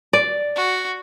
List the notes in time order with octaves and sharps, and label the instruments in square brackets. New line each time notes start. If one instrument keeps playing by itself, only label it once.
[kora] D5
[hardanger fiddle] F#4